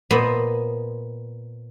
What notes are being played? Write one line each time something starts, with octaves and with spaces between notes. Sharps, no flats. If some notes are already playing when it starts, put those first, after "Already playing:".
A#2 B3 C5 D#5 B5